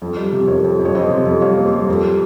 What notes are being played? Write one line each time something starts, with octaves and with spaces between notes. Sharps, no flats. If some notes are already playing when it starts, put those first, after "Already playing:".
F2
G3
C3
F2 A#4 C#5
F2
F2
C#5
F2 C5 D#5
C3
F2
G3 C#5 F5
A#3
C5
G3
F2 A#4
G3